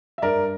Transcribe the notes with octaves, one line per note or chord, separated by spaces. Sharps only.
E5
G2 A#4 D5